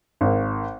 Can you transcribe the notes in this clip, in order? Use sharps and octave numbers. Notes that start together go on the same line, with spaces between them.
G#1